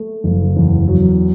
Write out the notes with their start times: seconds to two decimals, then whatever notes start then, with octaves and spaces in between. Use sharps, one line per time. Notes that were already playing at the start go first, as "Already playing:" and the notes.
Already playing: A3
0.24 F#1
0.56 E2
0.87 F#3